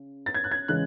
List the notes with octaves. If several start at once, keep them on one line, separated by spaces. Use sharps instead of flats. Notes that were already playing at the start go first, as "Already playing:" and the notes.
Already playing: C#3
A6
G#6
F#6
G#6
C#3 E3 G#3 F#6